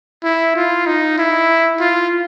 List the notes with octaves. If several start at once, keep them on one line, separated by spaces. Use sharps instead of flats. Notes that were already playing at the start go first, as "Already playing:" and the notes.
E4
F4
D#4
E4
F4